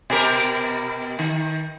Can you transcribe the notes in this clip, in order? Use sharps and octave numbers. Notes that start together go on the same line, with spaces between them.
B2 G4 A#4
D#3